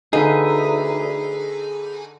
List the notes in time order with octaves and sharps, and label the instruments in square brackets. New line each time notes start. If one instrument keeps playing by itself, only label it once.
[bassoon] D2 [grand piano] D3 F5 [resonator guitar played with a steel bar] D#4 [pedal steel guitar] G#4 B4 E5